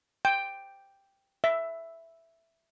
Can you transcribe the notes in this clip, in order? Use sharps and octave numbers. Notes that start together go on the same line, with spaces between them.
G5
E5